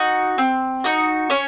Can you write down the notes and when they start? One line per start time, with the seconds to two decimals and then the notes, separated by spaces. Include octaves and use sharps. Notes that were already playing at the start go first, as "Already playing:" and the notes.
Already playing: D#4 F#4
0.38 C4
0.84 D#4 F#4
1.30 C#4 C#5